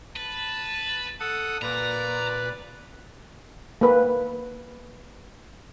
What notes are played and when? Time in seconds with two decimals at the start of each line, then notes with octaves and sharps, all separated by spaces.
0.16 B4 A5
1.20 A4 F#5 D#6
1.62 A#2 B4 D5 A#5
3.81 A#3 B4